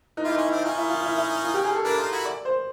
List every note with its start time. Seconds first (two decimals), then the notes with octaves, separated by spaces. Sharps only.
0.17 D#4
0.24 E4 F4 G4
0.34 D#4
0.38 C#4
0.44 E4
0.51 C4 D4
0.64 C#4 D#4 F4
0.77 E4
0.89 F4
1.04 E4
1.18 E4
1.44 F4
1.54 G4
1.65 G#4
1.75 A4
1.84 D4 E4 A#4
1.98 D#4 F4
2.12 E4 F#4
2.25 D5
2.45 C5